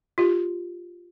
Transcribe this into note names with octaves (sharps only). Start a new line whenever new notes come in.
F4 G4